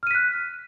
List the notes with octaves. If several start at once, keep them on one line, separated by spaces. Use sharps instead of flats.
F6 F#6 B6 D#7